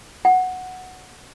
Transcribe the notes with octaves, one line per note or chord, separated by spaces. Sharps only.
F#5